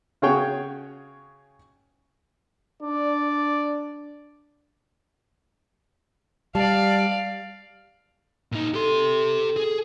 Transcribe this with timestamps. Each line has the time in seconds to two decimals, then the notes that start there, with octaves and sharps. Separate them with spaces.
0.22 C#3 F#4 G#4 C#5 G5
2.83 D4 D5
6.55 G3 D5 F5 A5
8.52 A#2 D#4
8.74 G4 A4 C6
9.56 G#4